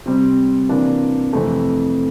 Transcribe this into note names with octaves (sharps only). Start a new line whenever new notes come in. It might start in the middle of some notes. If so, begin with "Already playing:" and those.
C3 G3 C4
C3 E3 A#3 D4
F2 C3 E3 A3